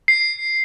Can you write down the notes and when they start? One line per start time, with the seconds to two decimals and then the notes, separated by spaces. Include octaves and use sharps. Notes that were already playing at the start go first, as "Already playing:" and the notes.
0.08 C7